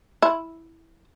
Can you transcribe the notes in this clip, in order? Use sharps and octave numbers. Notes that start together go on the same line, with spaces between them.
E4